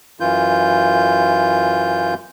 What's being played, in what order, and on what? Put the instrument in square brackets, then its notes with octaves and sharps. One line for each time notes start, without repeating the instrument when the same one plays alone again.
[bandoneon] F#2 E3 F4 G6